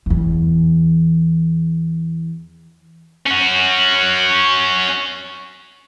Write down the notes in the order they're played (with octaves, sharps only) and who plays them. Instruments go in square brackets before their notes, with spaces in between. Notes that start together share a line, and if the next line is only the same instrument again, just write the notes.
[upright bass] E2 E3
[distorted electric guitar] C#4 F#4